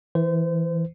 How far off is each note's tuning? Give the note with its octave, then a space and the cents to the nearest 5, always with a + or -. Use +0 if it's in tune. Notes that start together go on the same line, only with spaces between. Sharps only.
E3 -5 C5 -30